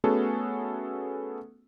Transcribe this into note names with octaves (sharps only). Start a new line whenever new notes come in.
A3 B3 C#4 F#4 G#4 A4